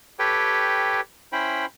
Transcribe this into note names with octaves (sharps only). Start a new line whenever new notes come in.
G4 A4 B4 C#5 G5
C#4 E4 C5 G5 B5